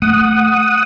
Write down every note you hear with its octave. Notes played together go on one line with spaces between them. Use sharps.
A3 F#5 D#6